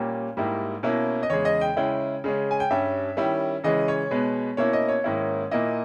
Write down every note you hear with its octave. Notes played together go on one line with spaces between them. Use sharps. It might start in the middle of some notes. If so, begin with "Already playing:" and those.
Already playing: A#2 G3 A#3 C#4
G#2 G3 A#3 E4
B2 A#3 C#4 E4
D#5
E2 C#3 G#3 C#5
D#5
G5
C#3 G#3 C#4 E4 G5
C#3 G#3 C#4
G#5
G5
G2 G3 C#4 E5
D#3 G3 C#4 E4
C#3 E3 G#3 C#4 D#5
C#5
B2 G#3 B3
B2 A#3 C#4 E4 C#5
D#5
C#5
G#2 D#3 A#3 C#4 E4
A#2 A#3 E4 D#5